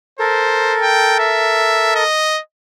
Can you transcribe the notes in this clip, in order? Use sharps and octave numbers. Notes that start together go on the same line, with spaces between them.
A4 A#4 C5
G5
E5
D#5